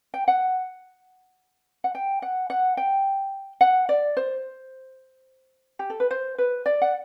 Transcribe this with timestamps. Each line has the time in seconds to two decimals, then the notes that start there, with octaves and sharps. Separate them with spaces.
0.14 G5
0.28 F#5
1.84 F#5
1.95 G5
2.22 F#5
2.50 F#5
2.77 G5
3.61 F#5
3.89 D5
4.17 C5
5.79 G4
5.90 A4
6.00 B4
6.11 C5
6.38 B4
6.66 D5
6.82 F#5